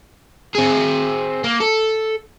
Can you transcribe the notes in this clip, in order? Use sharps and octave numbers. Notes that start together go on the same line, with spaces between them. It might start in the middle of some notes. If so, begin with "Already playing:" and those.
C4 G#4
A#3
A4